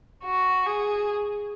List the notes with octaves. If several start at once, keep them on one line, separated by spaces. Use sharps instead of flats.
F#4
G#4